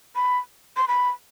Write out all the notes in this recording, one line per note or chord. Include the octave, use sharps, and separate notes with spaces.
B5
C6
B5